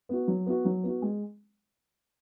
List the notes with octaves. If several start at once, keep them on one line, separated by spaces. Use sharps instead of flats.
B3 F#4
F#3
B3 F#4
F#3
B3 F#4
G#3